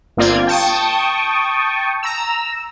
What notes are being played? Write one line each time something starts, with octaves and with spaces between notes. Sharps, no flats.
G1 A#3 C4 F4 D5 G#6
G5 A5 C#6 D#6
A#5 E6